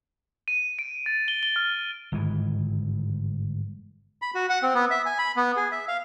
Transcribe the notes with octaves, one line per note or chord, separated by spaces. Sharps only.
D#7
D7
A6
G7
G7
F6
G1 G#2 D#3 E3
B5
F#4
F#5
C4
B3
E5
G#5
B5
B3
G#4
E5
F5